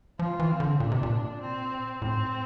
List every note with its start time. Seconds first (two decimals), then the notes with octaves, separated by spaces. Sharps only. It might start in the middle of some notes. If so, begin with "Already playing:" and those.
0.19 F3 F4
0.40 E3
0.51 C4
0.60 D3
0.80 A#2 D4
0.92 C3
1.03 A#2
1.41 C4
2.02 A2 C4